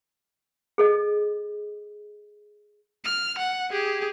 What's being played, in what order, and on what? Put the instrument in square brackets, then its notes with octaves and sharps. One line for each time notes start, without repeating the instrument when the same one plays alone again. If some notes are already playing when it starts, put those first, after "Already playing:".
[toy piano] G#4 A4 D#5
[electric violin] F6
F#5
G4 G#4